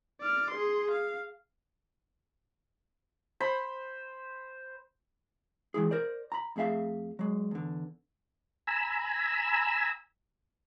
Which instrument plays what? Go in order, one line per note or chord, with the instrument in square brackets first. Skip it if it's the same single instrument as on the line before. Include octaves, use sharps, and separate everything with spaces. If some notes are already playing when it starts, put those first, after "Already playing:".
[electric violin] D5 F6
G#4 C6
F5
[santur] C5 B5
[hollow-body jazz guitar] E3 G#3 E4 G#4
A#4 C5 D5
A#5 B5
F2 A3 G#4 E5 F5
F#3 G#3
E2 D3
[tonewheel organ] G#5 A#5 B5 E6